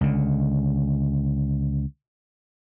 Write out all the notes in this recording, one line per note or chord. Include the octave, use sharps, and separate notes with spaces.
C#2 D3